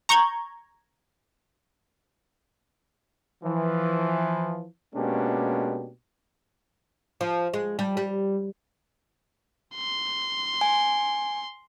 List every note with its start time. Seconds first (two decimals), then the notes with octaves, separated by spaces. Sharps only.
0.09 A#5 C#6 G6 G#6
3.44 E3 F3
4.95 B2 G#3 A#3 C#4 D4 G4
7.21 F3
7.54 G#3
7.79 G3
7.97 G3
9.76 C6
10.61 G#5